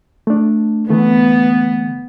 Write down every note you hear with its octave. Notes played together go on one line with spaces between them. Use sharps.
A3 D4
D3 E3 A3 B3